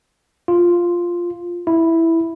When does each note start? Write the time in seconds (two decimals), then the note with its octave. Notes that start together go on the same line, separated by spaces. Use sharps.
0.48 F4
1.67 E4